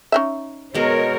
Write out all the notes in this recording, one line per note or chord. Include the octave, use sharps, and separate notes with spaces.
C#4 D#4 E5
B2 G#3 A#4 C#5